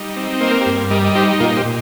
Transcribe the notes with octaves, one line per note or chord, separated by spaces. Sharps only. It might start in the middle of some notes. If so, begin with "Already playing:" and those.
Already playing: G3 D#4
C4
A#3 C5
A#4
G4 C5
G2
G3 A#4 D#5
D#5
D#4 G4 C5
A#2 F4 A#4
G4 C5
A#2